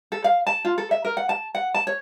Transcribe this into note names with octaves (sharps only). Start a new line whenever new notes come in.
A4
F5
A5
F4
A4
E5
A#4
F#5
A5
F#5
A5
C#5